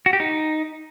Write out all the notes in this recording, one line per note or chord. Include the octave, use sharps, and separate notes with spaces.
F#4
G4
D#4